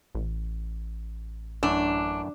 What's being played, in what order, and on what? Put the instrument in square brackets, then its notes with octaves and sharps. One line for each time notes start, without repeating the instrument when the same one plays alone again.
[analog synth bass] A1
[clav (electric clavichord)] F#2 E3 A3 [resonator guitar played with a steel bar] D4